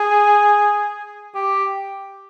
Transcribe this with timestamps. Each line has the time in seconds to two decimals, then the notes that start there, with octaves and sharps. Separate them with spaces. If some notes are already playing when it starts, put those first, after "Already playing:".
Already playing: G#4
1.35 G4